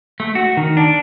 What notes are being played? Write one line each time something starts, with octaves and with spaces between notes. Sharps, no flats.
A3
F#4
D#3
D4